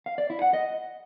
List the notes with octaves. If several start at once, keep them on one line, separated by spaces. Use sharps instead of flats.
F5
D5
E4
F#5
D#5